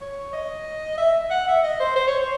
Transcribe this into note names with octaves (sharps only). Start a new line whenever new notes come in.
C#5
D#5
E5
F#5
E5
D#5
C5
C5
C#5
C5